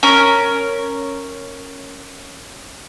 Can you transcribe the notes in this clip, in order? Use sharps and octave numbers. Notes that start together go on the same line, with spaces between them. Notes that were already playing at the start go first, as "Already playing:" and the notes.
C#4 A#4